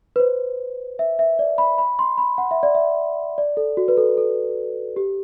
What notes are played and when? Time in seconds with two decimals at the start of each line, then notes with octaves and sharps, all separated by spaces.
0.16 B4
0.20 C5
0.99 E5
1.19 E5
1.39 D5
1.58 B5
1.78 B5
1.99 C6
2.18 B5
2.38 F#5
2.51 E5
2.63 D5
2.75 E5
3.38 D5
3.57 A4
3.77 F#4
3.88 B4
3.98 A4
4.17 A4
4.96 G4